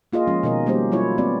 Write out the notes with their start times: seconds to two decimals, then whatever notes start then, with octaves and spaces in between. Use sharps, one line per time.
0.13 A#3 F4 G#4 D#5
0.27 F3 G#3 C#4
0.43 B2 D#3 A#4 D#5
0.66 G3 A#3 C#4 G4 C5
0.92 F#3 G3 E4 F4 C#5
1.18 A3 B3 C4 D5